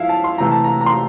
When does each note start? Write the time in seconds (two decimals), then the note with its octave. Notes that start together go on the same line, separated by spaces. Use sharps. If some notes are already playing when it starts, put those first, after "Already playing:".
Already playing: F3 E4 E5 F5
0.09 A5
0.24 C6
0.38 C3 E3 A3 A#5
0.51 A5
0.64 A#5
0.81 A#5
0.86 C6